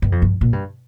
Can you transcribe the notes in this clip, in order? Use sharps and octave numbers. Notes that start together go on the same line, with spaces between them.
G2
F2
G2
A#2
G2